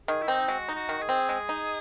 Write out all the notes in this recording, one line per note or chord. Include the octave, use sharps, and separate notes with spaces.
D#3 G#4
E4
C4 D#4
G#3 F#4
D#4
F#4
D#3
G#4
C4
G#3
D#4